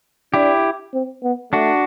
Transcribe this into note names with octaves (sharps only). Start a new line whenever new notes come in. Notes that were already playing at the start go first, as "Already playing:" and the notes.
D4 E4 G4
C4
B3
A3 D4 F#4